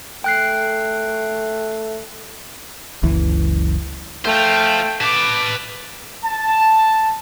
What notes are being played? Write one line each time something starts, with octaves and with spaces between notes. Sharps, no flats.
A3 G5 F#6 C7
F#1 C#2 E3
A3 C5 F5 G5
B4 A5 D6
A5